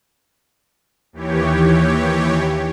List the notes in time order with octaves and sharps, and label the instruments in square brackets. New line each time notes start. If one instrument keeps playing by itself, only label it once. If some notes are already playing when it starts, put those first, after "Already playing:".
[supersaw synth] D#2 E3 G4 C#5